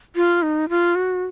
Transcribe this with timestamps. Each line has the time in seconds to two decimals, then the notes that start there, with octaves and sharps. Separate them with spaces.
0.16 F4
0.42 D#4
0.69 F4
0.95 F#4